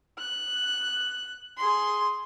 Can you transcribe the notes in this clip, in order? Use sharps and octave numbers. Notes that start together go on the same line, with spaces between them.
F#6
G#4 C6